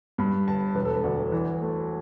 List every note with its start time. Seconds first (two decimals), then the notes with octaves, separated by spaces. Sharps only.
0.18 G2 B5
0.48 G1 A5
0.75 E1 B4
0.85 A4
0.95 B4
1.04 D2 D5
1.32 E3 D5
1.61 A3